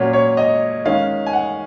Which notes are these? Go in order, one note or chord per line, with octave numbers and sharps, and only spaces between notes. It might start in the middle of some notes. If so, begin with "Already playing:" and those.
Already playing: A#2 F#3 C#4
C#5
D#5
D#3 G#3 C#4 F5
G#5
F#5